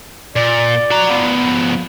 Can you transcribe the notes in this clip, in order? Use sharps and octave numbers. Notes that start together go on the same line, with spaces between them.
A#2 D5
F#4 A#5
F3 B3